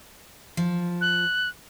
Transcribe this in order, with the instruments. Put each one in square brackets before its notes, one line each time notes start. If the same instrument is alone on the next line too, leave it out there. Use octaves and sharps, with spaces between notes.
[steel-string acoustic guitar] F3
[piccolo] F#6